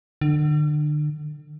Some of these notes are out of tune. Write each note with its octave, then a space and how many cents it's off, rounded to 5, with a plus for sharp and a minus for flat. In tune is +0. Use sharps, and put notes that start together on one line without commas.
D3 +35